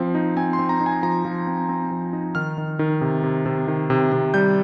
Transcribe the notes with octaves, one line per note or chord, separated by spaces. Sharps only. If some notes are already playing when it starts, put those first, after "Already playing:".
Already playing: F3 C4
D#4
C4 G#5
C6
C4
A#5
D#4
G#5
F3 A#5
F3
C4
C4
F3
D#4
D#3 F6
D#3
D#3
C3
C3
C3
D#3
C3
C3
G3 G6